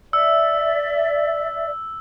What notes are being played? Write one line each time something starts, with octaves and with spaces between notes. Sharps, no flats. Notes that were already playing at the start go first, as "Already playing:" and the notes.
D5 E5 E6